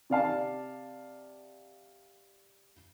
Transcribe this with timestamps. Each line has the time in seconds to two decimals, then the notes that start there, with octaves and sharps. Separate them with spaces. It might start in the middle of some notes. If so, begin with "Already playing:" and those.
0.10 C3 D5 F5 A5